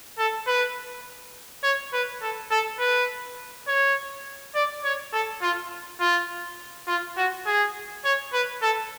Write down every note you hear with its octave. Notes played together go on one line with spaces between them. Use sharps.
A4
B4
C#5
B4
A4
A4
B4
C#5
D5
C#5
A4
F4
F4
F4
F#4
G#4
C#5
B4
A4